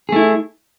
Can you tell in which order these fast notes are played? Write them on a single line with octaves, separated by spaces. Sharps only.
G#4 A3 E4